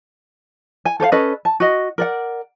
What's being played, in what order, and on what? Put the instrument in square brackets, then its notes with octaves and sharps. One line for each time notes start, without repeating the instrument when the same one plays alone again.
[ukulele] G#5
A4 C5 C#5 F5
C#4 A4 B4 D#5
A5
F#4 D#5
A#4 D5 F#5